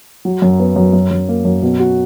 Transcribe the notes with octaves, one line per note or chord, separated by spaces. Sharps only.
F#3
F#2
B3
F#2
F#2
F#2
A#3
F#2
B2
F#4